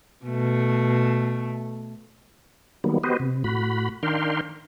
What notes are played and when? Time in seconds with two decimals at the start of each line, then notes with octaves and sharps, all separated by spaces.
0.25 B2 A3
2.84 D#3 F#3 G3 A#3 B3
3.04 B3 F#4 G4 B4 C5 D#5
3.20 C3
3.44 A2 F#4 B5
4.03 D#3 D4 A#4 F5 G5 C6